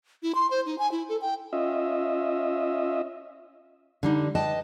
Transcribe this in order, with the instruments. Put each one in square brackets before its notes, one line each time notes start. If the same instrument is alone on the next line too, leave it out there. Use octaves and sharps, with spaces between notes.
[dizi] E4
C6
C5
D#4
G#5
E4
A4
G5
[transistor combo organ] C#4 F4 D#5 E5
[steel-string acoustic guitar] D3 G3 D#4
B4 D#5 G5 A5